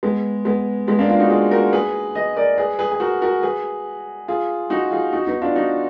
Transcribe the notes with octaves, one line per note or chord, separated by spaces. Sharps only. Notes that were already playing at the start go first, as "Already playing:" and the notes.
G#3 B3
G#3 B3
G#3 B3
A#3 D4
D4 F4
D#4 F#4
F4 G#4
F#4 A#4
G#4 B4
B4 D#5
A#4 D5
G#4 B4
G#4 B4
G#4
F#4 A#4
F#4 A#4
G#4 B4
F4 G#4
D#4 F#4
F4 G#4
D#4 F#4
B3 D#4
D4 F4
D#4 F#4